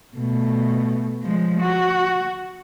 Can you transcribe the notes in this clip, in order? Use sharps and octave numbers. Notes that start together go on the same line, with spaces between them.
B2 A3
F3 G#3
F#4